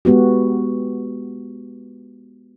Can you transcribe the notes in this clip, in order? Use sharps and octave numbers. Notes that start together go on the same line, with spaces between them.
G#3 B3 F#4 G4